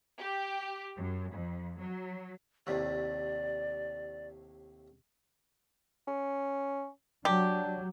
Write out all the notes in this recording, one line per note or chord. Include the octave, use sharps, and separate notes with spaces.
G4
F#2
F2
F#3
D#2 A2 C3 D5
C#4
F#3 D4 G4